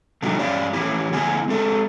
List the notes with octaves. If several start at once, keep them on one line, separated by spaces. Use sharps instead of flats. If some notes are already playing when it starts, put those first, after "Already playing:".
B2 D3 F3 G3 D#4 F#4
G2 C#4 D5 F5
E3 C#4 E4 G4
D3 B3 E4 G#5
G#3 C4 A4